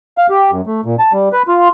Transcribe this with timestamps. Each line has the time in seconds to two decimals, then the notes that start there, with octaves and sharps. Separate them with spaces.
0.18 F5
0.30 G4
0.51 F#2
0.67 A3
0.85 A#2
0.99 A5
1.13 G3
1.33 B4
1.48 F4